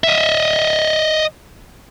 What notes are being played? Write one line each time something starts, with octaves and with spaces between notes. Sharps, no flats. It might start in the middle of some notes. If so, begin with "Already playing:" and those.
D#5 E5